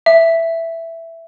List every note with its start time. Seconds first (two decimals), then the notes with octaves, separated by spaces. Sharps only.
0.06 E5